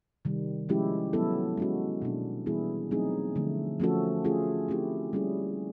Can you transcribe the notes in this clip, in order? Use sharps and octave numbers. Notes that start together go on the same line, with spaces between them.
C3 D#3 G3
F3 G#3 C#4 E4 G4
F#3 B3 E4 A4
G#3 C#4 F#4
B2 F#3 A#3 D4
E3 G3 B3 E4 G#4
F#3 A3 C4 D#4 G#4
D3 F3 A3
F3 A3 C#4 F#4 A4
A3 C#4 F4 G#4
A3 C4 E4 G4
G3 A#3 C#4 E4 G#4